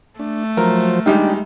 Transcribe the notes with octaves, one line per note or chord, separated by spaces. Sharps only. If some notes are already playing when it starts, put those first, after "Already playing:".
A3 D4
F3 F#3 A#4 C5
D#3 G3 G#3 D4 D#4 G4